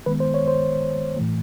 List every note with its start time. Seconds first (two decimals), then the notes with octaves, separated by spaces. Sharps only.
0.06 D#3 G#3 B3 B4
0.20 C5
0.34 C#5
0.48 C5
1.17 A2 E3 A3